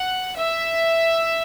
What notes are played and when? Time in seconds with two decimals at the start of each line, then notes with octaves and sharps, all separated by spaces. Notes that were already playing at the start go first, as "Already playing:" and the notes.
Already playing: F#5
0.37 E5